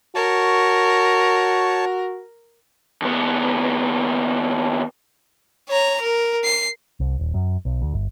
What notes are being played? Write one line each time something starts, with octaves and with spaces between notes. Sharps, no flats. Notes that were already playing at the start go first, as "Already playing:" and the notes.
F#4 A#4 C#5 A5 C#6
D#2 B3
C#5 A#5
A#4
C7
C2
D#1
F#2
B1
D2
G1